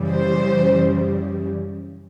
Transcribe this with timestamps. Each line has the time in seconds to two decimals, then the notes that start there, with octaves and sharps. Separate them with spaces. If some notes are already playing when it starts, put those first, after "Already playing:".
Already playing: F#2 C#3 E3 G3
0.10 C5